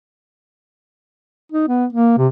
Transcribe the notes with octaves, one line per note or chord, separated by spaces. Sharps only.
D#4
B3
A#3
C3